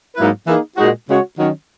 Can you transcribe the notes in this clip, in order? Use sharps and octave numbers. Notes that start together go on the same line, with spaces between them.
G#2 F#3 A#3 E4 B4
E3 A#3 D#4 G#4
A#2 G#3 D#4 F#4
C#3 G#3 C#4 F#4 C#5
D#3 F#3 C#4 F#4 C#5